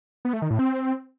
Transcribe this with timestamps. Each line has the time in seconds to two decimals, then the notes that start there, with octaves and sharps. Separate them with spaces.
0.25 B3
0.33 A3
0.42 D#3
0.50 A2
0.59 C4